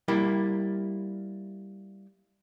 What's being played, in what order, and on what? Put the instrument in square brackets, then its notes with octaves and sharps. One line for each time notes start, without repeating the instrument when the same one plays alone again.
[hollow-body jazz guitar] G3 A#3 E4 G4